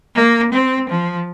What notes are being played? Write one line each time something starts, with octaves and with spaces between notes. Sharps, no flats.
A#3
C4
F3